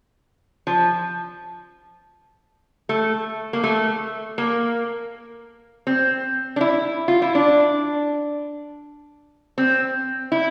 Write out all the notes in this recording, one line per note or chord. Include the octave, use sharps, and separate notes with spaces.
F3
A3
A#3
A3
A#3
C4
D4
E4
F4
E4
D4
C4
E4